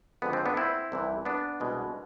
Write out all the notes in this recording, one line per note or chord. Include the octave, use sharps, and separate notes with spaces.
F2 D3 G#3 B3
C4
B3 D4
C4 E4
C2 C3 E3
B3 D4
C2 B2 G#3